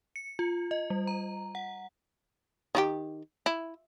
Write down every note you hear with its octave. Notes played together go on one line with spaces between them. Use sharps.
C#7
F4
D#5
G3
A#5
F#5
D#3 E4 G4
E4